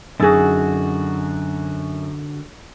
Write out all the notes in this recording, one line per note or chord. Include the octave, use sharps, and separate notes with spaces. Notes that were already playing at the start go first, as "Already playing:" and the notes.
F#2 D3 D#4 F#4 G#4 E6 A6